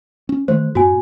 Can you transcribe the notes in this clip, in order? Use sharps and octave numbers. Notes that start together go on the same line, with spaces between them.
C#4
D#3 E3 A3 C5
F#2 A2 B3 F#4 G#5